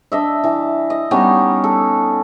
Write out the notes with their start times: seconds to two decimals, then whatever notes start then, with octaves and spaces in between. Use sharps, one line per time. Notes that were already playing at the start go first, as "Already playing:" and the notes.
0.12 D4 D#5 E5
0.44 E3
0.90 D#5
1.11 G3 B3 C#4 D#4
1.64 A4